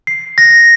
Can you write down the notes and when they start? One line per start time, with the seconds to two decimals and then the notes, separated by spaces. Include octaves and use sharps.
0.07 C7
0.38 A#6